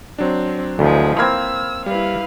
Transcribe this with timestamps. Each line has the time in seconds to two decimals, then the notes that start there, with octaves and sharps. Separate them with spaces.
0.18 F#3 C4 D4
0.79 D2 E3 F3 G#3
1.19 A#3 C4 B5 E6 F6 G#6
1.86 G3 E4 B4 F5